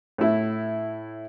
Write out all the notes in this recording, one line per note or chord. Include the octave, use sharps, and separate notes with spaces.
A2 E4